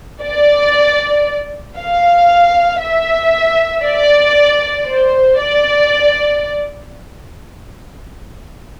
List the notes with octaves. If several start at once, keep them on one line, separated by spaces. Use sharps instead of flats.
D5
F5
E5
D5
C5
D5